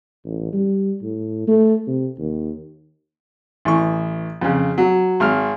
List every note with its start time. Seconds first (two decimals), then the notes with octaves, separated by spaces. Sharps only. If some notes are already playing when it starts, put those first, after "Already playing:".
0.25 A1
0.53 G3
1.02 A2
1.47 A3
1.87 C3
2.19 D#2
3.65 A1 E3 C#6
4.41 F2 C#3
4.78 F#3
5.20 G#1 F6